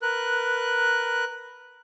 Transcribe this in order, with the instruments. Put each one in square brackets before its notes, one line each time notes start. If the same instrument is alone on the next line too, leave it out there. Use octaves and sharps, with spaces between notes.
[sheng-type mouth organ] A#4 B4 F#6